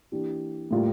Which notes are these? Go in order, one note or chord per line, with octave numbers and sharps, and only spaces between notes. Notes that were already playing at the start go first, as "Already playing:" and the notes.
E3 A#3 D4 G4
A2 G3 A#3 F4